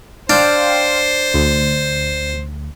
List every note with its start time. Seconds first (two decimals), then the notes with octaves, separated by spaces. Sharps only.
0.30 D4 C5 F5 G5 C6
1.34 D2